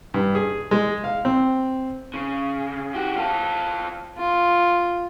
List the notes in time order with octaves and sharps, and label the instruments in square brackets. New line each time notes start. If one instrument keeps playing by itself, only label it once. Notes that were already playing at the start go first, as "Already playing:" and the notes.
[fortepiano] G2
G#4
G#3
F5
C4
[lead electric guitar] C#3
F#4 G4
F4 A4
[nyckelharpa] F4